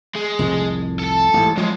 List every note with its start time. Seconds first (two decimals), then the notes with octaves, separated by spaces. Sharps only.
0.16 G#3
0.39 C2 F2 A2
0.99 A4 A5
1.34 A1 G#2
1.57 F3 F#3 G#3